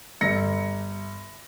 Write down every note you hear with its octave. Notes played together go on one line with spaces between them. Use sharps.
G1 A#6 C#7